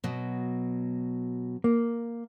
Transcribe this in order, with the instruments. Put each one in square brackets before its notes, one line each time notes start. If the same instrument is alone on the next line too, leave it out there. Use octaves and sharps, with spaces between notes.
[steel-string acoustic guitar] B2 F#3
[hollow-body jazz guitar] A#3